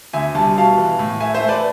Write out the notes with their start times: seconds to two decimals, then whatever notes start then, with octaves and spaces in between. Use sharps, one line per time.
0.13 D2 E5 G#5
0.35 C2 A5
0.56 B2 F5 A5
0.78 E3
0.99 A2
1.20 A3 E5 G#5
1.34 C5 E5
1.42 A3
1.49 B4 D5